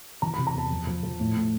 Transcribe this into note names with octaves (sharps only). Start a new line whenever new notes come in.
E3 A#5
B5
C3
A#5
E2 A5
F3
F3
F3
A2
A2